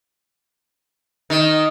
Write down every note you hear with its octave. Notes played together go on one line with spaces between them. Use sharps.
D#3